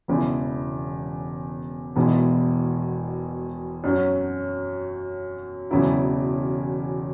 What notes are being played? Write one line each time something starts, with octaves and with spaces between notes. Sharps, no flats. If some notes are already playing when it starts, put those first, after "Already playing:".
E1 E2 C#3 G#3 E4
E1 E2 B2 G#3 E4
F#2 F#3 C#4
E1 E2 C#3 F#3 E4